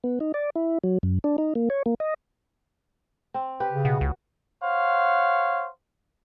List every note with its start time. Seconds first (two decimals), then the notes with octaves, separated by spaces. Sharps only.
0.04 B3
0.20 D#4
0.34 D5
0.56 E4
0.84 F#3
1.03 F#2
1.24 D4
1.38 D#4
1.55 A#3
1.70 C#5
1.86 A#3
2.00 D#5
3.34 C4
3.60 G4 B4
3.72 C#3
3.85 B2 F#4
4.01 C#2
4.63 C5 C#5 F5 F#5